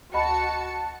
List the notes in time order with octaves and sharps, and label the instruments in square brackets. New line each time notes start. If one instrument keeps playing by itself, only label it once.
[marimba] D2 D#5 B5 [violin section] F#4 A5 C#7